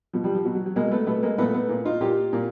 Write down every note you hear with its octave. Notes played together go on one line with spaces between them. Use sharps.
B2 F3
F3 G3
F3
B2 F#3
F#3
F#3
B2 G#3 A#3
A3 B3
B2 A3 B3
G#3 A#3
A#2 A3 B3
A3 B3
A#2
D#4 F4
A#2 F4 G4
A#2